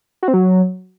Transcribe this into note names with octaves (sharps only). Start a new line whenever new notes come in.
F#4
C4
F#3